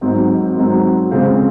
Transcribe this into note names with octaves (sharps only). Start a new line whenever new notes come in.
G#1 G#2 F#3 C4
G#1 G#2 F#3 C4
F2 C#3 G#3 C4 F4